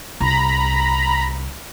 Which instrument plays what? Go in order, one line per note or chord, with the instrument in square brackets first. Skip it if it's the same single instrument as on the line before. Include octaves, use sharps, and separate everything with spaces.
[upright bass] C2 [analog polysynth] A#5 B5